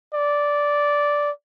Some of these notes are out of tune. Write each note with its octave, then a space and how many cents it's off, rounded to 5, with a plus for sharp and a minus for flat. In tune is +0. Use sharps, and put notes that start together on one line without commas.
D5 -10